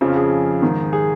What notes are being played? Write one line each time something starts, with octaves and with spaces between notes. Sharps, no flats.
F2 C#3 F3
G#4
G#2 D#3
G#4